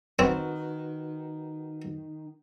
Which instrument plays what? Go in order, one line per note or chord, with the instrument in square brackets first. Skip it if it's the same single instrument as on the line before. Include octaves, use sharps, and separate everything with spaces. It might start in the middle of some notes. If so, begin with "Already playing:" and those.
[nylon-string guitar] D#3 [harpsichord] C4 [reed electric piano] F#4 B4 F#5